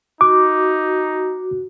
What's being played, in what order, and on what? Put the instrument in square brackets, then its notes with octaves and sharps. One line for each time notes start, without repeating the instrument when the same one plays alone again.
[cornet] D#4 [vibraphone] F#4 [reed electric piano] D6